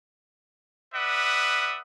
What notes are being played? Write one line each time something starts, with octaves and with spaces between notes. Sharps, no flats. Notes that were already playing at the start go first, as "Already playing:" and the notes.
B4 D5 E5 F#5 D#6